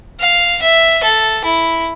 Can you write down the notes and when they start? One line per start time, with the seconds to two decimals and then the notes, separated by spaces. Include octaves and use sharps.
0.20 F5
0.62 E5
1.03 A4
1.45 E4